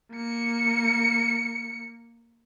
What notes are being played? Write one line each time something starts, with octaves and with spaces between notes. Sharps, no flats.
A#3 C#7